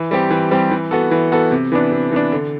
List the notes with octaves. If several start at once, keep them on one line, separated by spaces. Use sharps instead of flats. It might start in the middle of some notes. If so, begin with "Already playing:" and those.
Already playing: E3
G3 C4 G4
E3
G3 C4 G4
E3
B3 F#4 A4
E3
B3 F#4 A4
C3
E3 B3 D4
C3
E3 B3 D4
D3